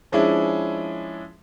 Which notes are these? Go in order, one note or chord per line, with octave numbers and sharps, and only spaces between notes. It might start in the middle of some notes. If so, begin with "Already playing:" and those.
F3 G#3 C#4 D4 E4